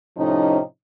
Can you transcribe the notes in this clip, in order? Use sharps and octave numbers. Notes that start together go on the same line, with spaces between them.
A2 C3 F3 C#4 D#4